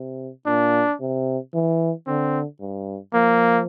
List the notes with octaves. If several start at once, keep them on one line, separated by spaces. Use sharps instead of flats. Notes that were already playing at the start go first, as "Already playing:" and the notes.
Already playing: C3
A#2 D4
C3
E3
D3 C4
G2
F3 A#3